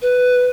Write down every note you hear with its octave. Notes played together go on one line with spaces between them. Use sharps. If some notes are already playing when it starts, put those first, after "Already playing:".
B4